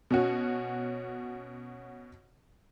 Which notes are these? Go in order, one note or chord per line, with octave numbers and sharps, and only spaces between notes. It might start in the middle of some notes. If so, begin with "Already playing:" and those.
B2 C#4 F#4